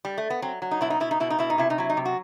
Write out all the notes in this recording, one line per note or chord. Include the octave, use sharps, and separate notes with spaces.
G3
A3
B3
F#3 C4
F#3
D#4
B2 E4
D#4
B2 E4
D#4
B2 E4
D#4
B2 E4
D#4
C3 E4
D#4
F#3 E4
D#4
C3
F#4